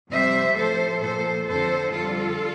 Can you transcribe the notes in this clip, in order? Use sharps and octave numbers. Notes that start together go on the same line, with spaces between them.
F2 C3 G3 C5 E5
A2 F3 A4 C5
A#2 F3 A4 C5
F2 D3 F3 A4 C5
F2 D3 G3 F4 A4